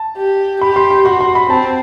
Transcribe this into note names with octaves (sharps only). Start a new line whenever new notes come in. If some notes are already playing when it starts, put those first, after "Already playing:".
Already playing: A5
G4
G4 B5
C6
C6
F#4 C6
C6
B5
C4 A5